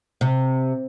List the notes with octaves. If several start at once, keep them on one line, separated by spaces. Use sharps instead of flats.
C3